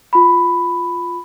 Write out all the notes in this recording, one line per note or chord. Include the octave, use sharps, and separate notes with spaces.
F4 B5